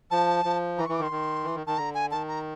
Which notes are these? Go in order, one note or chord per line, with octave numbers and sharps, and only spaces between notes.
F3 A5
F3
E3 A#5
C#6
E3
D6
D#3
C6
D#3
E3
D#3
D#3 A5
D3 A#5
G#5
D#3 A5
A#5